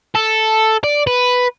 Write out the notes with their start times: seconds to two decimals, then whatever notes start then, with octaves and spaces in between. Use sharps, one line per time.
0.15 A4
0.84 D5
1.07 B4